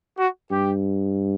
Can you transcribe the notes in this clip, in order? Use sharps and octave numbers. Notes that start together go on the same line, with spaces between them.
F#4
G2 G4